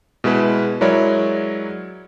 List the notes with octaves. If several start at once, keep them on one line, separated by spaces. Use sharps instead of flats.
B2 G#3 E4 B4
F#3 G#3 E4 A#4 C#5 D5